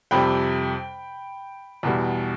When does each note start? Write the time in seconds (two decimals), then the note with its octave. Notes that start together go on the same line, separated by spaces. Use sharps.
0.11 F2 C3 G3 G5 B5
1.83 E2 B2 G3